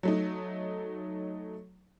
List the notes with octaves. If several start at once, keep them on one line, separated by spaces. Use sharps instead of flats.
F#3 A3 D#4